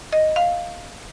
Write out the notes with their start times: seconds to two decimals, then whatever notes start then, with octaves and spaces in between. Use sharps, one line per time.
0.13 D#5
0.36 F5